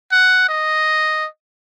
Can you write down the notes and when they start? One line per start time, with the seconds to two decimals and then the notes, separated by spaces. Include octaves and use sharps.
0.12 F#5
0.49 D#5